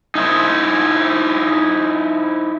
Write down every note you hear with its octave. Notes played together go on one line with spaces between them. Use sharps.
D#4 E4 C5